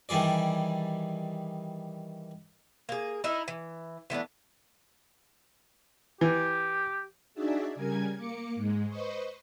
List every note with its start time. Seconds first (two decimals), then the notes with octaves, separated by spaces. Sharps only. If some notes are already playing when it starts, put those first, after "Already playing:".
0.09 D#3 E3 G3 G#4 D5
2.89 A#3 G#4
3.24 D#4 E4 A#4
3.48 E3
4.10 E3 A3 B3 D4
6.21 E3 G4
7.34 D4 D#4 F#4 G#4 D5 E5
7.75 C#3 G3 A#4 G#5 G#6
8.17 A#3 D6 C#7
8.55 G#2 G#3
8.88 B4 C5 D#5 C#6